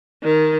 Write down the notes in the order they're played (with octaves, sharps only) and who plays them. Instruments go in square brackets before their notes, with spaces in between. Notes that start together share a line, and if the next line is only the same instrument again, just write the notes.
[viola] D#3